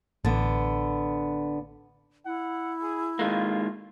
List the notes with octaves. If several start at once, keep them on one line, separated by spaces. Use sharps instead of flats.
A1 D3 B3
E4 F#5
G#4
D#3 G#3 A#3 F4